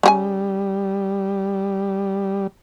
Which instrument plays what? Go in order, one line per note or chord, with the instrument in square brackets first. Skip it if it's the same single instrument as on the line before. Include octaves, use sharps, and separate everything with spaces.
[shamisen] C#3 F#4 G#5 [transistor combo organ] G3